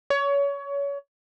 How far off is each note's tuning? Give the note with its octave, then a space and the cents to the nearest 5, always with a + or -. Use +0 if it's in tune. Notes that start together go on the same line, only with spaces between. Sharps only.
C#5 +25